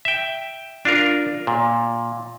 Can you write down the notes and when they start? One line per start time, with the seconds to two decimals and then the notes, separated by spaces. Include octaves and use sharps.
0.05 E5 G5
0.85 D4 F4 A#4
1.47 A#2